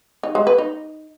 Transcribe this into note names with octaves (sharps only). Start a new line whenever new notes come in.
D#4
G#3
B4
D#4